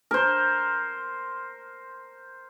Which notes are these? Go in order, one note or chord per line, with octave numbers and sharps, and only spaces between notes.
A#4 C5